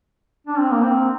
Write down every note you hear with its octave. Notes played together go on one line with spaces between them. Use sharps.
D4
C4
A#3
C4